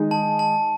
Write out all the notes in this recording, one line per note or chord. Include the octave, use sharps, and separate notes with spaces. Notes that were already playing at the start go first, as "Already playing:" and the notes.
Already playing: D#3 G#3 D#4 G#4
A5
A5